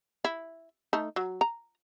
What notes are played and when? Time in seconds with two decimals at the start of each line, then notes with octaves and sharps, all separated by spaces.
0.25 E4
0.93 A3 D#4 A5
1.16 F#3
1.41 A#5